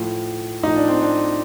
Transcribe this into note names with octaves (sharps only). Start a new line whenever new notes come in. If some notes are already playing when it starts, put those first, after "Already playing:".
Already playing: A2 F3
A2 F3 D#4
D4
C4
D4